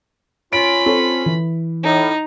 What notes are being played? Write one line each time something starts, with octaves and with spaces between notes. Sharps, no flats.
C#4 F4 B5 D7
C4 A4 C#5
E3
A2 D#4